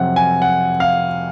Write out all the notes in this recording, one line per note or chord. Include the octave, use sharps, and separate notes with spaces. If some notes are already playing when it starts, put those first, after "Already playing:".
Already playing: F2 C3 F#3 F#5
G#5
F#5
F5